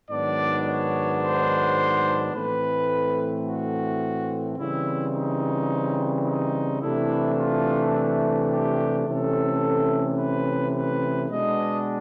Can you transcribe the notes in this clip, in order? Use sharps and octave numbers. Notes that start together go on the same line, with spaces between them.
G#2 D#3 F#3 B3 D4 D5
C#5
C5
A2 E3 A3 C4 B4
F#4
C#3 E3 G3 C4 E4
D#4
D#4
C3 E3 A3 D4 E4
F4
G4
C3 E3 A3 C#4 A4
B4
B4
B2 G#3 B3 D4 D#5